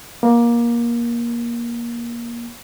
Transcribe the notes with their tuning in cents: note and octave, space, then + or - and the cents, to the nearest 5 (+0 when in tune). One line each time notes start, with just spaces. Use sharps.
A#3 +20